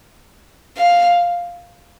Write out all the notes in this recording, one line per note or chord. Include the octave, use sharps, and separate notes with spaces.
F5